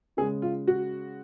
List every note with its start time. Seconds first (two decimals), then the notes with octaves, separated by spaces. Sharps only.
0.17 C#3 G#4
0.21 G#3
0.42 F4
0.67 F#4